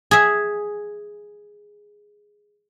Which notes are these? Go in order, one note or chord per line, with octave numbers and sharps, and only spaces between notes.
G#4 E5